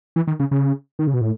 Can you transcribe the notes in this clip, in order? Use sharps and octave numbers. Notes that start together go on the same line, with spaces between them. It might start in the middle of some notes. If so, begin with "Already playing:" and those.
E3
D#3
C#3
C#3
D#3
C#3
B2
A2